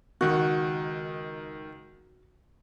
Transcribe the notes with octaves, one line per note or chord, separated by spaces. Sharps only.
C#2 D#3 F#4 F#6